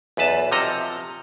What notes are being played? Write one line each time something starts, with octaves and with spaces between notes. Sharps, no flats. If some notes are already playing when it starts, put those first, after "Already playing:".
B1 E2 B4 A5
C3 F3 A4 D#5 A#5